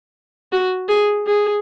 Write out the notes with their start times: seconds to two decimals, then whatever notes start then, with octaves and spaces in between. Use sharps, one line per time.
0.52 F#4
0.88 G#4
1.27 G#4